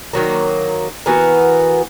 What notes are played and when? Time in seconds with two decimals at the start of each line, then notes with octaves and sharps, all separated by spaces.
0.13 D#3 F#3 A#3
1.06 E3 B3 F#4 A#4